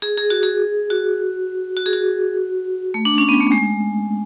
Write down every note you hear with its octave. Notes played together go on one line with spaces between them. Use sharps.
G#4
G#4
F#4
G#4
F#4
F#4
G#4
F#4
A3
D4
C#4
B3
A3
G#3